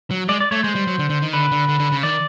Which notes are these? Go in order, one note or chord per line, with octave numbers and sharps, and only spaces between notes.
F#3
G#3 D5
D5
A3 C#5
G#3 C5
G3
F#3
D3
D3
D#3
D3 B4
D3
D3
D3
C#3
D#3 D5